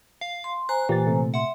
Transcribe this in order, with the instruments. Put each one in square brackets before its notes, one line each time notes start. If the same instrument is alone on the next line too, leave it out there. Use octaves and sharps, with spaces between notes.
[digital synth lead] F5
[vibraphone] C6
[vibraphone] C5 G#5 A#5 [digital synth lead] F#6
[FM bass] A#2 [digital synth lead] E3 [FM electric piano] G4 A6
[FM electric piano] C3 A3
[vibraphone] E5 C6 [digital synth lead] F#5